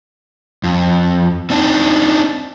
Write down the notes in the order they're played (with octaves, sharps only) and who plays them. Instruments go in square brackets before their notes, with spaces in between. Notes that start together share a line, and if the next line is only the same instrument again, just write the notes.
[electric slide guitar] F2
C4 D4 D#4